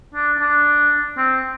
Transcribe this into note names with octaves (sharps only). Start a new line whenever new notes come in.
D4
D4
C4